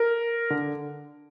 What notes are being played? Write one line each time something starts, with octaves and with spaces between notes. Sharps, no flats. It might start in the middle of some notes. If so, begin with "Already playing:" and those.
Already playing: A#4
D3